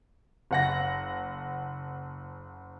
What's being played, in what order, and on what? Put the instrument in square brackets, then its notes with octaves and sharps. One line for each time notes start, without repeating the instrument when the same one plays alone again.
[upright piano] F#1 F#5 A#6